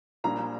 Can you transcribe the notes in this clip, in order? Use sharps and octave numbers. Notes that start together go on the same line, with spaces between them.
A#1 A#2 G3 D4 A#5